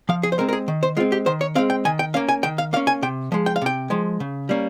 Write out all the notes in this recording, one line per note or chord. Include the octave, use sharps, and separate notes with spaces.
F3 F5
G#4
C5
G#3 C4 A#4
A#4
G#4
D#3
C5
G#3 C4 F4
G4
D#3 C5
C#5
G#3 C4 F5
G5
D#3 G#5
G5
A#3 C#4 F5
G#5
D#3 G5
F5
A#3 C#4 F5
G#5
C3 G5
F3 G#3
G5
F5
C3 G5
F3 G#3
C#3
G3 A#3 C#4